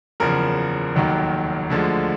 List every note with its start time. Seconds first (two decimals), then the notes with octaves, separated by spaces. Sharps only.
0.20 F#1 E2 C#3 F3 A#4
0.96 F1 D#2 D#3 F#3
1.70 D2 D3 F3 G#3